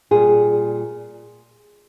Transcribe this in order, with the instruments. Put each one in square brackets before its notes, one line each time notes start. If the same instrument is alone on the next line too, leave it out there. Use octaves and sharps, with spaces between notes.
[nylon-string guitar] A#2 G3 G#4